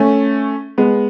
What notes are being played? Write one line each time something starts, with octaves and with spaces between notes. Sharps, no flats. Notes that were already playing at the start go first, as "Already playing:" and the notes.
Already playing: A3 C#4
G#3 B3